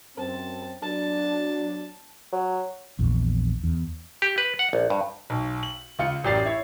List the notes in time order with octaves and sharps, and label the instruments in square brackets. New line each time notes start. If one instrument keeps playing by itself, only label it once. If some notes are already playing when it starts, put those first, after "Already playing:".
[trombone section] F#2 C4 [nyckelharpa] A5
[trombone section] F#3 D4 [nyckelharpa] A5
[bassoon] F#3
[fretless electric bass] A#1 E2
E2
[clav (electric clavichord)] G4
B4
F#5
A#1
G2
[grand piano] B1
F#7
C#2 F4 C#7
A1 F#2 G4 D5 A6 C7
E4 C#5